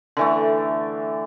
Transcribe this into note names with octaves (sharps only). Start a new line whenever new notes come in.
D3 E3 A3